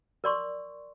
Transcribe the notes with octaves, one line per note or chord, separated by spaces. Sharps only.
A#4 D5 C6 C#6